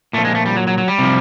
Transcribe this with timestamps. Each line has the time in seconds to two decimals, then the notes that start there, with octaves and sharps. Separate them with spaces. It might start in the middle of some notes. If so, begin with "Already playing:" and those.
0.13 A#2 F3 A3
0.25 G#3
0.35 A3
0.46 G3
0.56 F#3
0.67 F#3
0.78 F#3
0.88 G3
0.98 C3 F3